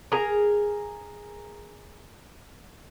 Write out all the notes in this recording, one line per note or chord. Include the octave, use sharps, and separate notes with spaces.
G#4 A#4 A#5